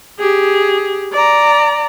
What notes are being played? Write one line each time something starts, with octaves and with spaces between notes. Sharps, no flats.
G4 G#4
D5 A#5